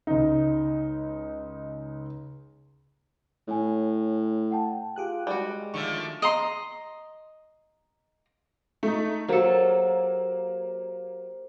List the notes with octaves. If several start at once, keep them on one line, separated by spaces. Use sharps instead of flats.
C#2 D#4
A2 C#5 G#5
F#5 G5 A5
F4 G4 G#4 F#6
G3 G#3 F#4
D3 D#3 F3 A3 C#6
D#5 A#5 C6
A3 D#4
F#3 A#3 G4 A4 A#4 C5